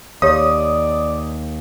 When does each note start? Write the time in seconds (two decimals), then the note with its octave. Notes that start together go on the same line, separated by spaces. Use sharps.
0.22 D#2 G4 C#5 D5 F5 D#6